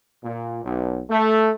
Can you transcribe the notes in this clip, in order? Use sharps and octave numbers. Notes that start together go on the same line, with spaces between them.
A#2
B1
A3